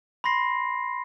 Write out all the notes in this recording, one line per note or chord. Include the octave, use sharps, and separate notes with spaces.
B5 C6 A#6 C7